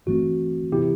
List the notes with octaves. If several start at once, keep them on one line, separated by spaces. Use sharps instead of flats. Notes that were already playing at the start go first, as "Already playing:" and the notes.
G1 G2 E3 A3 C4 F#4
C3 E3 B3 E4 G4